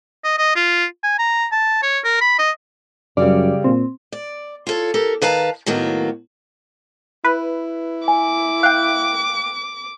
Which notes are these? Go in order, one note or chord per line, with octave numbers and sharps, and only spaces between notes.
D#5
D#5
F4
G#5
A#5
A5
C#5
A#4
B5
D#5
F#2 C#3 G3 D5
A#2 C4
D5
F4 A4 C#5
G4 A4 A#4
D#3 B4 F5 A5 A#5
A2 D#3 F#3 A#3 B3
E4 B4
G#5 D6
F5 G5 F#6